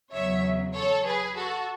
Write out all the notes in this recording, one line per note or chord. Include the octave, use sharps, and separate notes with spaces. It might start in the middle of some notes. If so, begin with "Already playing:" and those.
E2 C#3 F#3 C#5 E5
A4 C#5
G#4 B4
F#4 A4